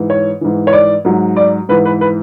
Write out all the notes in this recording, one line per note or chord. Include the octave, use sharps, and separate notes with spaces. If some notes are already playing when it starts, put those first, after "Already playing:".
Already playing: G#2 E3
C#5
G#2 E3
C#5
D5
G#2 F#3
D5
G#2 E3 B4
B4
B4